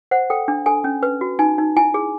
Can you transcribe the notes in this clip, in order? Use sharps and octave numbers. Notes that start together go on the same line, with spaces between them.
C5 F#5
A4 G5
D4
A4 G#5
C#4
B4
F#4
D#4 G#5
D#4
E4 G#5
G#4